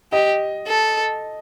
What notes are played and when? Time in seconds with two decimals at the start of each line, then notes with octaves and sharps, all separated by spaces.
0.12 G4 D#5
0.67 A4